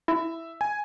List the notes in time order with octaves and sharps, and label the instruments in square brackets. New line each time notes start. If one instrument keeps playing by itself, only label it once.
[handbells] E4 [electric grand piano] E5
[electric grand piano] G#5